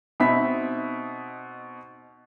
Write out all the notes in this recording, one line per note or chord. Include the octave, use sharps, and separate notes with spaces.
B2 C4 D#4 E5 B5 B6